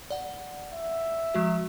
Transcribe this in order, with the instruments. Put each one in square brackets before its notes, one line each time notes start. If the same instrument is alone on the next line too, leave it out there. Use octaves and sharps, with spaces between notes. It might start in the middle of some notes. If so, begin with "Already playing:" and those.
[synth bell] D5 F#5
[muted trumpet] E5
[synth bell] F3 G#3 F#4